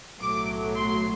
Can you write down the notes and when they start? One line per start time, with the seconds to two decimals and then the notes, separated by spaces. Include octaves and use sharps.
0.21 B1 A2 F#3 A3 D6
0.76 C6